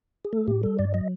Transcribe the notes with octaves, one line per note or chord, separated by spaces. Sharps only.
G#4
A3 A4
A2 G4
G3 A4
G2 D5
F#3 D#5